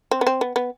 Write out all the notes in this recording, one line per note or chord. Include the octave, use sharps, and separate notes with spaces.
C4
B3
C4
B3
B3